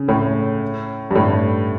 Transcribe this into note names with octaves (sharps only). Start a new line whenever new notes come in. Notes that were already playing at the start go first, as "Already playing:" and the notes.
Already playing: C#3
A2
G2
A2